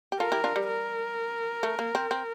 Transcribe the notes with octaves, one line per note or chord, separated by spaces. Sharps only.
G4
F4 A4 A#4
E4 G4
D4 F4
G3
A#4
A3
A#3
C4
C4